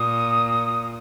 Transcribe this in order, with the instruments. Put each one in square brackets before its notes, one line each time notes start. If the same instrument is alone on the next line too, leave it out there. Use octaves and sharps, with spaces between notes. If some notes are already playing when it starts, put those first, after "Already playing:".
Already playing: [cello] A#2 [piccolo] D#6